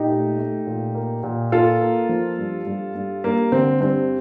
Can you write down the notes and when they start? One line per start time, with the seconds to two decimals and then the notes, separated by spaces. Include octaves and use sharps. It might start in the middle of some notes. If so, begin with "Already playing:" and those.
Already playing: A#2 D#4 G4
0.10 A3
0.38 A3
0.67 A#2
0.95 A#3
1.24 A#2
1.52 A#3 F4 A4
1.81 A#3
2.09 F3
2.39 G2
2.67 G2
2.95 G2
3.24 G2 A#3
3.52 D3 C4
3.81 G2 C4